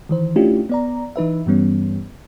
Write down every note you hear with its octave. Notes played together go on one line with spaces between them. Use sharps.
D#3 E3 C5
A3 C#4 D4 E4 F4 G4
B3 D5 A#5
E3 D#4 B4 E5
G2 E3 G3 B3 C#4